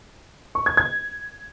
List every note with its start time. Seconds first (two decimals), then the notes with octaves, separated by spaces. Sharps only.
0.55 C#6
0.66 G#6
0.77 G#6